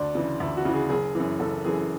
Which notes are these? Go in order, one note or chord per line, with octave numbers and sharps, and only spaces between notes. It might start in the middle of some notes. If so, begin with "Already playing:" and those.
Already playing: D2 D4
C#3 E3
D2 E4
F#4
C#3 E3
G#4
F#1 G#4
F#2 E3
F#1 A4
F#2 E3 G#4